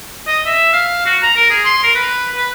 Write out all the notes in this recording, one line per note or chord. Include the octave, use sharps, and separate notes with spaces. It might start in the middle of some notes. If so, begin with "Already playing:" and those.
D#5
E5
F5
F#4
A#5
A#4
G#4
C6
A#4
B4
B4